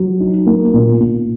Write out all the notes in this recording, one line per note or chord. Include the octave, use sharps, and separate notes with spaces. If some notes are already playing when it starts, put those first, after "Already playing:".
Already playing: F#3
D#4
A#3
A#2
A#2